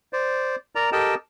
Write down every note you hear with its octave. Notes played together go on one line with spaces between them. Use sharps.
C5 D5
A#4 D5 A#5
G4 A4 A#4 D#5 G5 A5